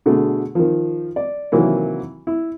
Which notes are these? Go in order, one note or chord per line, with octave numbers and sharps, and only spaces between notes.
B2 D3 A3 G#4
D#3 F3
D5
C3 D#3 E3 F#3 A#3
E4